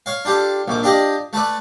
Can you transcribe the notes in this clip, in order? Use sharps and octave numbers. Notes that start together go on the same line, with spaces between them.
C#5 F5
D4 F4 G4 A4
A#1 F2 D6
D4 F4 G4 D5 D#5
A3 A4 B4 D5